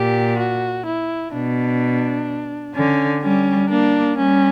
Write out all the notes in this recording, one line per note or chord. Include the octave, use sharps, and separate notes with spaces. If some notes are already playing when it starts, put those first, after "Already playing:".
Already playing: A#2 G4
F#4
E4
B2 D4
D3 C#4
G3 C#4
A#3 D4
G3 C#4